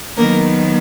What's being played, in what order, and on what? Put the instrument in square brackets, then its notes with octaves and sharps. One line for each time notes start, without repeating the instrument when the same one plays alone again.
[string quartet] D#3 F#3 A#3 B3 A#4